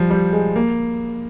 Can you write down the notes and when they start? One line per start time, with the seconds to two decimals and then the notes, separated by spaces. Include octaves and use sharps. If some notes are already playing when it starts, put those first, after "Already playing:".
Already playing: F3 G3
0.10 G3
0.33 G#3
0.56 A#3